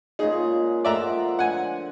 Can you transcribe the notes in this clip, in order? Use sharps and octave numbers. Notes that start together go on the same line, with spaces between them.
A#2 C#3 G#3 D#4 G#4
F3 D5 E5 F#5 A#5 C6
D3 F#5 G#5